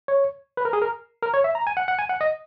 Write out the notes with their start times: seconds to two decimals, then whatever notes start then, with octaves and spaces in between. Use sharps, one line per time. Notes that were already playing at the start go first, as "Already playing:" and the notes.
0.08 C#5
0.57 B4
0.65 A#4
0.73 G#4
0.82 A#4
1.22 A#4
1.34 C#5
1.44 E5
1.55 A#5
1.67 G#5
1.77 F#5
1.88 F#5
1.99 G#5
2.09 F#5
2.21 D#5